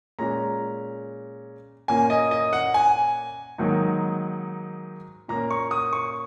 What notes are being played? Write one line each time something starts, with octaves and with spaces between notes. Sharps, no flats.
A#2 G#3 C#4 A#5
A#2 A#3 C#4 G#5
D#5
D#5
F#5
G#5
G#2 D#3 F#3 A#3 D#4
A#2 A#3 C#4 A#5
C#6
D#6
C#6